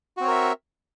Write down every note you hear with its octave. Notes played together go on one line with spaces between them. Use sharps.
C4 F#4 A#4 C#5 E5